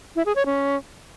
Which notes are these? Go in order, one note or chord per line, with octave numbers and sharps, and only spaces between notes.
E4
G#4
C#5
C#4